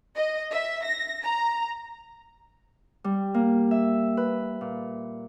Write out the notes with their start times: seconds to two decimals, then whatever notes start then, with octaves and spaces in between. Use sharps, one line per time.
0.15 D#5
0.52 E5
0.84 A#6
1.25 A#5
3.04 G3
3.34 A#3
3.71 E5
4.17 B4
4.61 A#2